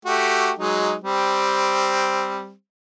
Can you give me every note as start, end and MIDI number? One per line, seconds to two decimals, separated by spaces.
0.05 0.52 57
0.05 0.52 66
0.05 0.52 67
0.59 0.94 54
0.59 0.94 56
0.59 0.94 63
1.04 2.52 55
1.04 2.52 60